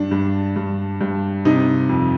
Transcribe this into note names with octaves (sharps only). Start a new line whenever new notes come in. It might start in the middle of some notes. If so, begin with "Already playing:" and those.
Already playing: G2 D4
G2
G2
G2
C3 D#4
F2